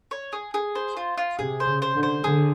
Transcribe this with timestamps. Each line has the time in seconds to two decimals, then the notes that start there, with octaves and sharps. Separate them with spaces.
0.11 C#5
0.33 G#4
0.54 G#4
0.75 C5
0.97 F4
1.17 F4
1.39 C3 G#4
1.60 C5
1.67 C#3
1.82 C5
1.95 D3
2.03 C5
2.23 D3 G#4